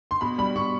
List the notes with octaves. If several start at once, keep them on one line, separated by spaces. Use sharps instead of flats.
C6
B2 B5
G3 B5
B2 C#6